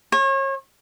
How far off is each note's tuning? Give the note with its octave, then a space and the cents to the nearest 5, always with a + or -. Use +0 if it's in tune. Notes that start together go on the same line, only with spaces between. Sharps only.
C#5 -35